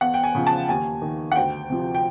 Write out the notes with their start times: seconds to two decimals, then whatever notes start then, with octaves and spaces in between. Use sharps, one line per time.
0.01 E2 F#5
0.14 G5
0.24 G#5
0.35 C#3 F3
0.47 A5
0.69 D#2 G#5
1.02 D#3
1.32 F#5
1.36 D2 G5
1.70 C3 F3
1.95 G5